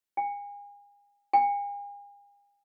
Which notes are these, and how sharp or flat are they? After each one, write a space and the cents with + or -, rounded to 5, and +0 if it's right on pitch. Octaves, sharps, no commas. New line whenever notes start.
G#5 -35
G#5 -45